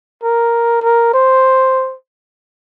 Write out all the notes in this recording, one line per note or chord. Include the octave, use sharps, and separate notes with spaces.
A#4
A#4
C5